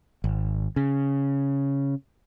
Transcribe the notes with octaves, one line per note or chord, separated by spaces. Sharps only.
G#1
C#3